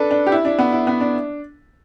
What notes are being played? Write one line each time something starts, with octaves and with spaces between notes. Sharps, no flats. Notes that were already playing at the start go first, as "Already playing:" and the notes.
Already playing: D4 A4 B4
D4
G4
E4
D4
B3
E4
B3
D4